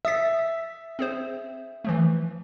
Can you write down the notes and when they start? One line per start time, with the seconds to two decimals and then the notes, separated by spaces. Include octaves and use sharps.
0.05 E5 D#6 A6 B6
0.99 C4 G#4 C5
1.84 E3 F3 A3